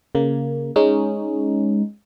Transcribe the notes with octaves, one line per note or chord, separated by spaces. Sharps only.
C#3 A#3
G#3 C#4 D#4